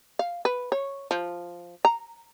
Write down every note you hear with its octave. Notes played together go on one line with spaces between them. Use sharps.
F5
B4
C#5
F3
A#5